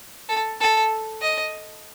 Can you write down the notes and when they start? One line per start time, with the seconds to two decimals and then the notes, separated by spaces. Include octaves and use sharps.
0.29 A4
0.61 A4
1.22 D#5